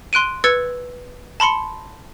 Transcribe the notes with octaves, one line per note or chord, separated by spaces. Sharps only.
C6 F#6 D7 D#7
B4 E6 G#6 A6 C#7
A5 B5 C6 C#7